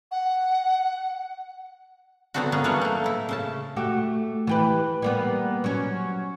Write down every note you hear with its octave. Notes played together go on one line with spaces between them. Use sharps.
F#5
D3 F#3 B3 C4 D4 F#4
A#3 B3 C#4 G#4
E3 F#3 G3 A#3 D4 C#5
A3 A#3
A2 E4
C#3 C#4 A5
A3 F#4 G4
E3 G4 B4
G3 A#3 B3
F#3 C#4